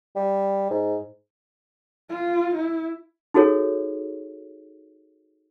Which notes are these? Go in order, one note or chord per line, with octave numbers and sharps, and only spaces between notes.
G3
G#2
F4
E4
D#4 F#4 G#4 A4 C#5